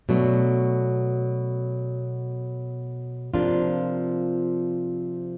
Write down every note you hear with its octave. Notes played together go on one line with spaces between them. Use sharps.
B2 F#3 A3 D4
C3 F3 A#3 D4 F4